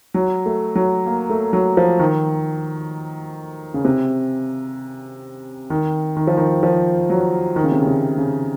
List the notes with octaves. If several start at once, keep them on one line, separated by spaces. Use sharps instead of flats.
F#3
A3
F#3
A#3
A3
F#3
F3
D#3
C#3
C3
D#3
D#3
F3
D#3
F3
F#3
D#3
C#3
C3
C#3
C3
C#3